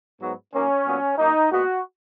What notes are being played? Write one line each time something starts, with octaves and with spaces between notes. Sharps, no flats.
G#2 F#3 B3
F#2 D#3 A#3 C#4
A#2 F#3 B3
F#2 D#3 A#3 D#4
A#2 G#3 B3 F#4